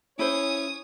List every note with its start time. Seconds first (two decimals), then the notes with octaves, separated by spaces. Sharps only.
0.19 C#4 E4 C5 C#5 D#6